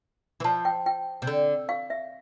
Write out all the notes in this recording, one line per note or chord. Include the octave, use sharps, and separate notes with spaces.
E3
F3 A5
G5
G5
C3
D3
F5
E5